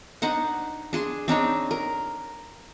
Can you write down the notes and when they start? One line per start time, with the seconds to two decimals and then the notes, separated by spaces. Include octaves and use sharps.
0.22 D4 D#4 C5 F#5
0.93 D4 G#4 C6
1.28 C4 D4 D#4 C#5
1.71 A#4